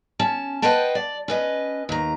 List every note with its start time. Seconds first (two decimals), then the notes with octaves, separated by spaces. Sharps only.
0.19 C#4 A5
0.62 B4 C5 D#5 F#5 G5 A5
0.95 D5
1.28 C#4 B4 D#5
1.89 D#2 A#5